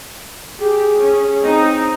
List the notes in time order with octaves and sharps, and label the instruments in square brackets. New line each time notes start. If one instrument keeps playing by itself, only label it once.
[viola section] G4 [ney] G#4
[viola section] C#4
C4 D#4